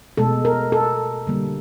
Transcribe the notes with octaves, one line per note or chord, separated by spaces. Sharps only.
B2 G#3 A4
A#4
A4
D3 G3 A#3